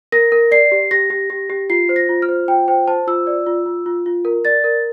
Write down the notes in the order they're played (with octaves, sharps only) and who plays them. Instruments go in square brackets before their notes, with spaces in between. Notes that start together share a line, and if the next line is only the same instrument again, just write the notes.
[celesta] A#4 A#6
A#4
D5 C7
G4
G4 A#6
G4
G4
G4
F4 C7
C5
A#6
F4
F6
C5
F4 G5
C5 G5
C5 A5
F4 E6
D5
F4
F4
F4
F4
A#4
D5 A6
A#4